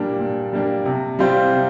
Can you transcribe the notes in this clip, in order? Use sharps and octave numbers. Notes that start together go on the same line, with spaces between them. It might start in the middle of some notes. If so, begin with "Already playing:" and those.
Already playing: A#2 G3 A#3 D4
A#2
G3 A#3 D4
C3
G3 C4 F4 C5
C3